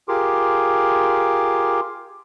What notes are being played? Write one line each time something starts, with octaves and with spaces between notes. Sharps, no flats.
F4 G4 G#4 A#4 C6 D6